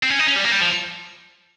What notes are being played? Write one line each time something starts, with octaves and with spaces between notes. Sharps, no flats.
C4
C#4
D#4
C#4
G3
A#3
G3
F3